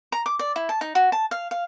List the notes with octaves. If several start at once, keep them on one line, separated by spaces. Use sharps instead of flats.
A#5
D6
D5
E4
A5
D#4
F#4
A5
F5
F5